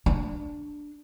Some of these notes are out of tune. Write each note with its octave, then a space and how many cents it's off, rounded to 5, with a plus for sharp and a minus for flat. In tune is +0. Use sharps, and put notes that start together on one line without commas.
D4 +5